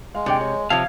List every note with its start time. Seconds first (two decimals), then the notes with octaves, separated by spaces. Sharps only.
0.15 G#3 F5
0.26 C3 D4 D5 G5
0.41 C#5
0.70 C3 F3 C#5 F5 A5